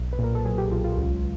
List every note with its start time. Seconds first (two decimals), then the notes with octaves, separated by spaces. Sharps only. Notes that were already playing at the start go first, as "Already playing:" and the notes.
Already playing: B1
0.13 B4
0.19 A#2 A#4
0.35 A4
0.45 F#3 G#4
0.58 G4
0.72 B1 F4
0.84 F4
0.98 C#2